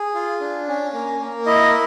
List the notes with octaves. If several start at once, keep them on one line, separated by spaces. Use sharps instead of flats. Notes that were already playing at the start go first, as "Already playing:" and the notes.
Already playing: G#4
F4
D4
C#4
A#3
A#3
E4 D#5